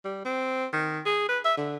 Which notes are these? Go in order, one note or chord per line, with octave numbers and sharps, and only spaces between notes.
G3
C4
D#3
G#4
B4
E5
D3